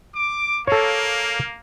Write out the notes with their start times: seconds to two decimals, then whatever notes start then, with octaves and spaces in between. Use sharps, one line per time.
0.15 D6
0.67 A#3 A4 C#5